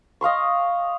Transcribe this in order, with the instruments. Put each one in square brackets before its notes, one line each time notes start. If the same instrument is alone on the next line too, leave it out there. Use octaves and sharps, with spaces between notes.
[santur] D#5 F5 C6 C#6